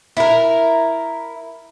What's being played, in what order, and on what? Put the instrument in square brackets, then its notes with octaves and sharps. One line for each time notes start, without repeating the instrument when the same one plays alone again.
[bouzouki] E4 A#4